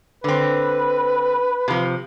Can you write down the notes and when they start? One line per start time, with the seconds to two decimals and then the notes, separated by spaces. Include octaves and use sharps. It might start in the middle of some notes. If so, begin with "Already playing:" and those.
0.24 D3 C4 B4
1.68 C3 F3